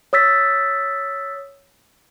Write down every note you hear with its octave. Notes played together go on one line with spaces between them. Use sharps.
C#5 D#6 E6 A6 B6